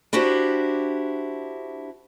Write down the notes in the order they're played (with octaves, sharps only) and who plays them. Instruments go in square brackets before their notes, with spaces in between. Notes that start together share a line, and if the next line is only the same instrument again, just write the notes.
[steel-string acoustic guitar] D4 E4 F#4 G4 C5